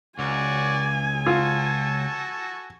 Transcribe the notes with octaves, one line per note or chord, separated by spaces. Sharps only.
C#2 F#4 D5 G#5
F4 F#4 A4